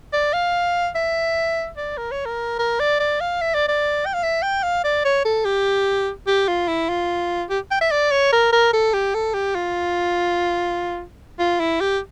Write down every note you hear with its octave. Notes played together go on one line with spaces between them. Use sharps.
D5
F5
E5
D5
A#4
C#5
A#4
A#4
D5
D5
F5
E5
D5
D5
G5
F5
E5
G5
F5
D5
C#5
A4
G4
G4
F4
E4
F4
G4
G5
E5
D5
C#5
A#4
A#4
A4
G4
A4
G4
F4
F4
E4
G4